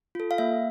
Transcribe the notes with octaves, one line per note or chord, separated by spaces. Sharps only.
F4 A4
F5
A#3 E5